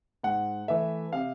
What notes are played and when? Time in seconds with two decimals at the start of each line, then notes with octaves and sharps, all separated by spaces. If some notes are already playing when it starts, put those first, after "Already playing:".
0.23 G#2 F#5
0.68 E3 A3 E5
1.13 C3 F5